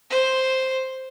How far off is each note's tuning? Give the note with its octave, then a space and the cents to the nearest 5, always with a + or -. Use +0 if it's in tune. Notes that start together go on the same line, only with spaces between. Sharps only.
C5 +0